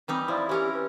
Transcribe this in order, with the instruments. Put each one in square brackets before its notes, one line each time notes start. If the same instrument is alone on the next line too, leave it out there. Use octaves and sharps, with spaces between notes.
[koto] E3 G3 D#4 [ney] C4
[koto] F3 [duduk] E4 [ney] D5
[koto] E3 C#4 A#4 [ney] G4
[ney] B4